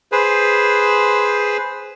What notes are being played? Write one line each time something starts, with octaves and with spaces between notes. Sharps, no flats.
G#4 B4 C5